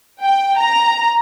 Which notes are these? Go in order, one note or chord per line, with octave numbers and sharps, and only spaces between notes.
G5
A#5